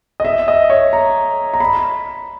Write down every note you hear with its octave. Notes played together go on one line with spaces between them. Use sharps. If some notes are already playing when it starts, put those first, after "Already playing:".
D#5
E5
D#5
C#5
A#5
A#5
B5